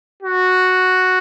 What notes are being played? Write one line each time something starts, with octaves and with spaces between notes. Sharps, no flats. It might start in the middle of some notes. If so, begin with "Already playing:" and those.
F#4